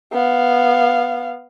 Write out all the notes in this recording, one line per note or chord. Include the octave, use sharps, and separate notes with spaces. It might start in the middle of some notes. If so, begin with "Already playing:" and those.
B3 F5